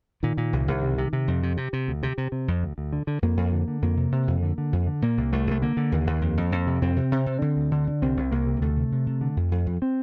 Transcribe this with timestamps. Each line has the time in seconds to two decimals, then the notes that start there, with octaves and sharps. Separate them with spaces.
0.23 A#2 D#3
0.38 A#2
0.53 C2
0.68 C2
0.82 C3
0.98 C3
1.13 C3
1.28 F2
1.43 C3
1.57 C3
1.73 C3
1.88 D2
2.03 C3
2.18 C3
2.32 C3
2.48 F2
2.63 D2
2.78 D2
2.93 D3
3.07 D3
3.22 F2 A#3
3.37 F2
3.53 D3
3.68 D3
3.82 F2 A#3
3.97 C3
4.12 C3
4.28 F2
4.43 D3
4.58 D3
4.73 F2
4.87 D3
5.02 A#2 A#3
5.17 C2
5.33 C2 A3
5.47 C2 A3
5.62 D3 A#3
5.77 D3
5.92 D#2
6.07 D#2
6.21 F2
6.37 F2
6.52 F2
6.67 C3
6.82 F2 C4
6.97 C3
7.12 C3
7.26 C3
7.42 D3
7.57 D2
7.71 D3
7.87 D3
8.02 C2 C4
8.17 C2
8.31 C2 A#3
8.47 C3
8.62 D2 A3
8.77 C3
8.92 C3
9.07 C3
9.21 D3
9.37 F2
9.52 F2
9.67 F2
9.82 C4